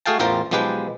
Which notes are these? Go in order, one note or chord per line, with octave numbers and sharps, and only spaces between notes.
A3 F#4 G#4 F5 G5 A5
A1 E2 F4 A#4 C5 G5
B1 F3 G#3 G4 B4 G5